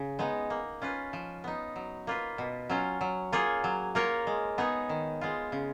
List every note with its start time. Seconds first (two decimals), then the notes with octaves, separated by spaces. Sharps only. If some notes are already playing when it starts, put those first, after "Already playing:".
Already playing: C#3
0.19 G#3 B3 D#4
0.50 A#3
0.82 C#4 F4 B4
1.13 F3
1.44 B3 D#4
1.76 F#3
2.07 A#3 F4 B4
2.38 B2
2.70 F#3 C#4 F4
3.01 F#3
3.32 A#3 F4 G#4 C#5
3.64 F#3
3.95 A#3 F4 A#4 C#5
4.27 G#3
4.58 B3 D#4 G#4 C#5
4.89 D#3
5.21 G#3 B3 F4
5.52 C#3